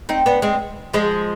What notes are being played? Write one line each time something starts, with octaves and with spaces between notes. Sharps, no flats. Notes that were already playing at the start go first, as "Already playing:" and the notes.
C4 D#4
B3 D4
G#3 C4
F3 G#3